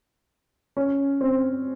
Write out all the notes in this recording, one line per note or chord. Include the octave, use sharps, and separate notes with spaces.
C#4
C4